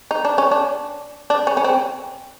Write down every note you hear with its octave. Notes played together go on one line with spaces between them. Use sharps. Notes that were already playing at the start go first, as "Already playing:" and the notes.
D#4
D4
C#4
D4
D4
C#4
C#4
C4